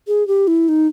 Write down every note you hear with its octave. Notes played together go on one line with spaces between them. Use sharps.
G#4
G4
E4
D#4